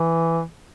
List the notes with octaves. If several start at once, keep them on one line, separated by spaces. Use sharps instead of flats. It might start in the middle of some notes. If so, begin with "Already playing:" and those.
Already playing: E3